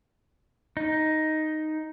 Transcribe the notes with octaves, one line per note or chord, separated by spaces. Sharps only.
D#4